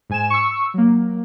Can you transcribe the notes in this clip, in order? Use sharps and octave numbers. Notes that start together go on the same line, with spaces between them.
G#2 G#5 E7
C#6 E6
F#3 A#3